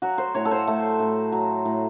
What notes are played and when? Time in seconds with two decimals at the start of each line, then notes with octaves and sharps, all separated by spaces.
0.02 F#3 F#4
0.18 C5
0.35 A2 C#5
0.45 A4
0.51 C5
0.67 A3
1.00 A2
1.32 F#3
1.65 A2